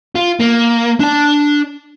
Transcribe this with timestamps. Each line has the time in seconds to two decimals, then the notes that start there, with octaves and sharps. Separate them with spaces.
0.15 F4
0.40 A#3
1.00 D4 A5